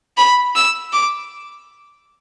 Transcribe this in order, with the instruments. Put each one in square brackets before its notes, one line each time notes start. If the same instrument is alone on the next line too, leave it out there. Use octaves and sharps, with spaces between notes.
[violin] B5
E6
D6